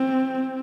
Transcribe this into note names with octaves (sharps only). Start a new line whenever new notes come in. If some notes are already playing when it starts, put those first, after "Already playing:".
Already playing: C4